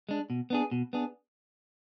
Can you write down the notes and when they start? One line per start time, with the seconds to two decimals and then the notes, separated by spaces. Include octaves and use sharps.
0.09 G#3 D4
0.30 B2
0.50 B3 D4 G#4
0.71 B2
0.93 B3 D4 G#4